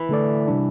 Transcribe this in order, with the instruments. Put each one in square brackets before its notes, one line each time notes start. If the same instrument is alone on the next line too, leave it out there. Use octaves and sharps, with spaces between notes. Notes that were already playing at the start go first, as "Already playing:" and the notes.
Already playing: [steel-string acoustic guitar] E3
[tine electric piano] D3 A3 E4 A4 D5
C3 G3 D4